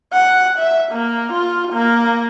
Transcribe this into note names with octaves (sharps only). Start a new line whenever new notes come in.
F#5
E5
A#3
F4
A#3